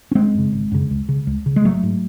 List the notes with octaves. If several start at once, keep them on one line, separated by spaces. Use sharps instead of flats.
C#4
G#1 G#3 C4
F#2 C#3
G#1
F#2 C#3
C#2
C#3
C#2
C#3
G#3
G#1 F#3 A3
G#2